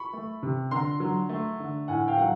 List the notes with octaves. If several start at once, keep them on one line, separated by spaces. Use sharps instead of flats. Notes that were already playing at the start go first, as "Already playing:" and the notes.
Already playing: B5 C#6
A3
C3
D3 A#5 C6
F#3
A3
D3
A2 F#5 G#5
F5 G5
F#3 F#5